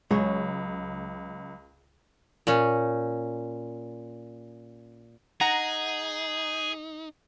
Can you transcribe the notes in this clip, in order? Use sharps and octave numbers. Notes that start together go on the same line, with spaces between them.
C#2 F#3 G#3 G#4 C#5
A#2 C#4
D#4 G#4 F#5 A#5